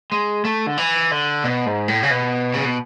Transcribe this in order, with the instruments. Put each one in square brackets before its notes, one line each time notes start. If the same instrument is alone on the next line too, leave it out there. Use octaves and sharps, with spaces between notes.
[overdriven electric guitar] G#3
A3
D3
E3
D3
B2
G#2
A2
C#3
B2
C#3
B2